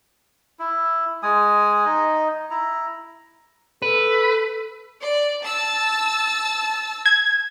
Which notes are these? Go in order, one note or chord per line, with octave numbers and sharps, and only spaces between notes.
E4
G#3 G#5 D#6
D#4 D#5
E4 A#5
A4 B4
D5
A5 E6 A6
G#6